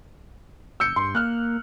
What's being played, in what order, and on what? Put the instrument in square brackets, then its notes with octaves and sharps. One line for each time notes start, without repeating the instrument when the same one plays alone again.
[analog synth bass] F#1 [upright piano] E6 G6 C#7
[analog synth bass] G2 [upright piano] C6
[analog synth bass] A#3 [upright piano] F6 F#6